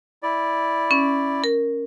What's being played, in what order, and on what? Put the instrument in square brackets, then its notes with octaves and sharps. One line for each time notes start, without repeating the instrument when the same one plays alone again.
[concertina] E4 D5
[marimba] C#4
A#4